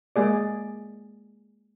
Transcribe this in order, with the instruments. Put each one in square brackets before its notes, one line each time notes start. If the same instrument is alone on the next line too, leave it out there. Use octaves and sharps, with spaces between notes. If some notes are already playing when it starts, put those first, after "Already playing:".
[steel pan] G#3 A#3 G#4 D5